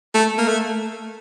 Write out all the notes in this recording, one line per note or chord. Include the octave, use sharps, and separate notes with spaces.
A3
A#3
A3